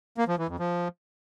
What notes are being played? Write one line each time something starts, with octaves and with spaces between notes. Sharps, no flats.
A#3
F3
E3
F2
F3